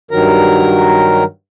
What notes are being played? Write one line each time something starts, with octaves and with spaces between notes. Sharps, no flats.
G2 D#3 F#3 A#4 A#5